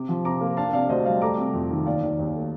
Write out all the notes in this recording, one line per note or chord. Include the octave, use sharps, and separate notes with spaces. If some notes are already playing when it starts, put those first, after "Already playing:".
Already playing: C3 D6
F3
C3 A#5 D6
A#3
D4 F5 A5
C3 D5 F5
D2 C5 D#5
G3 D5 F5
A3 A#5 D6
C3
F2
D#3
D#2 D5 F5
D#3
D#2
A3